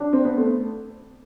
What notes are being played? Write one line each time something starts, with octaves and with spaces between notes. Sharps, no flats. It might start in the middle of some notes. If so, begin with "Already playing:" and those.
D4
C4
B3
A3